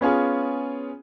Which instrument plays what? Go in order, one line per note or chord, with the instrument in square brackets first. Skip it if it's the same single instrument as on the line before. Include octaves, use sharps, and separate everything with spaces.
[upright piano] B3 C#4 F4 G#4